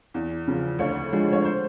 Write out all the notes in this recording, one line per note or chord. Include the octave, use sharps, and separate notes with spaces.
E2
C#3 F3
D2 C#5
D3 F3 G#3
C#5
C5